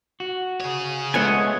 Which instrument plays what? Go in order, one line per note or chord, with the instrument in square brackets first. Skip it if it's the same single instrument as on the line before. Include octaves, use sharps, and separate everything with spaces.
[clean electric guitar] F#4
[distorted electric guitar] G#4 C#5
[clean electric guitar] G#3 A3 F4 [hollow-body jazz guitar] B3 C#4 [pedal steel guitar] D#5 F#5 G#5